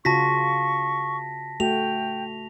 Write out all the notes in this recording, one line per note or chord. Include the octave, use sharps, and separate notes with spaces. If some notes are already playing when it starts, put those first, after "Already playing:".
C#3 F4 F#4 A5 C#6 A#6 B6
A3 F#4 G5 F7